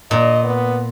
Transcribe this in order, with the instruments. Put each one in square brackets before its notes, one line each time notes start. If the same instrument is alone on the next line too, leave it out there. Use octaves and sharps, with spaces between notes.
[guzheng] A#2 [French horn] D#5
[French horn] B3